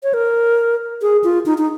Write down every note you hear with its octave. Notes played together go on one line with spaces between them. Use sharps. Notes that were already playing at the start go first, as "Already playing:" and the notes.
C#5
A#4
G#4
F4
D#4
D#4